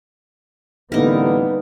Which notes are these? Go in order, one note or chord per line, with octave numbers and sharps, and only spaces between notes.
A1 D3 G3 A#3 B3 D#4 A#4